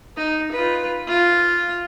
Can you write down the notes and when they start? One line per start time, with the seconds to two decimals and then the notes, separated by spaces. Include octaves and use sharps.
0.17 D#4
0.52 F4 B4
1.07 F4